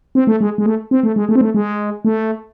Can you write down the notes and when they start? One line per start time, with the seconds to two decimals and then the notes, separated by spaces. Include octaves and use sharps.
0.15 C4
0.27 A3
0.41 G#3
0.58 G#3
0.66 A3
0.91 C4
1.03 A3
1.16 G#3
1.29 A3
1.36 C4
1.41 A3
1.55 G#3
2.05 A3